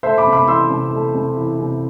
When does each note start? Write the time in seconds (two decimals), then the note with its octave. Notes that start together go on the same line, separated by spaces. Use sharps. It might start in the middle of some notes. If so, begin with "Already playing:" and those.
0.03 A3 C5 E5
0.18 B5 D6
0.26 C3
0.32 B5 D6
0.48 E3 C6 E6
0.70 C3
0.92 A3
1.15 C3
1.37 E3
1.60 C3